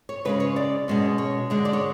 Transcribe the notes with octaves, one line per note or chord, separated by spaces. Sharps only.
C#5
C#3 G#3 C#4 B4
C#5
D5
B2 G#3 C#4
C#5
D3 G#3 D4
D5
C#5